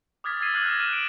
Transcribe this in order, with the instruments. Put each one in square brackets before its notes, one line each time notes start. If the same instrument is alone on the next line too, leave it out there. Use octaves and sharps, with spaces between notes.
[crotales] D6 D#6 F6 G#6 A6 B6
E6 G#6 A6 C7 D#7
D6 D#6 F6 F#6 G#6 F#7
F6 A#6 E7
F6 F#6 D#7 E7
D7 F#7